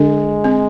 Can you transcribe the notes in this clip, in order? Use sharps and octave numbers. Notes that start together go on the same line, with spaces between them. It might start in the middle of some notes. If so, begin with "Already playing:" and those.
Already playing: D3 G#3 D4
C4